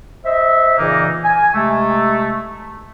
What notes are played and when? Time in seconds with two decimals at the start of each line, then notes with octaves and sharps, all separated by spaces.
0.25 C5 D#5 E5
0.78 A#2 C#3 E3 A#3 D#4
1.25 G#5
1.54 C3 G#3 A3